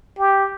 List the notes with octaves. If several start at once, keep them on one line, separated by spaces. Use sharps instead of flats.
G4